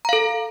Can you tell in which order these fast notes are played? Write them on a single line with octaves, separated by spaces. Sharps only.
A#5 F5 A4